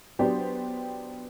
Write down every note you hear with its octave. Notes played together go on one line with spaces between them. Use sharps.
F#3 B3 D4 G4 C5